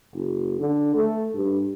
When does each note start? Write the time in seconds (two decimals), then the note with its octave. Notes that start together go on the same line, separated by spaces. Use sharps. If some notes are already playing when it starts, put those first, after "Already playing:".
0.14 F#1
0.60 D3
0.96 A3
1.34 G2